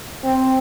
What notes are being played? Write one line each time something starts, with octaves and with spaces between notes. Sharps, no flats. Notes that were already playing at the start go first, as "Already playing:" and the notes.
C4